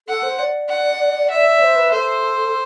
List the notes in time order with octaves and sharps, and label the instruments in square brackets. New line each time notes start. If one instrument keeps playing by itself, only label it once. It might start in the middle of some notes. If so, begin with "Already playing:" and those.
[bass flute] A4 [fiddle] F#5
[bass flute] C5
D5
[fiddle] F#5
E5
[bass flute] D5
C5
B4
[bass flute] A4 [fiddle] C5